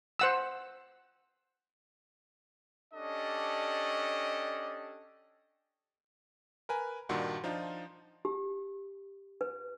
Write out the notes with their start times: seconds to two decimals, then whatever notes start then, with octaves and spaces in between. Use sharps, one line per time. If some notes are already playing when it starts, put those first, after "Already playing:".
0.19 C5 F#5 E6
2.94 C#4 D4 G4 A4 D5 D#5
6.69 A#4 B4 G#5
7.09 G2 A#2 D#3 D4 F#4 C6
7.44 F3 D4 D#4 F4
8.25 G4
9.41 B4